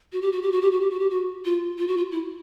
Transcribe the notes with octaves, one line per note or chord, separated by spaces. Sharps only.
F#4
G4
F#4
G4
F#4
G4
F#4
G4
F#4
G4
F#4
F4
F4
F#4
F4
E4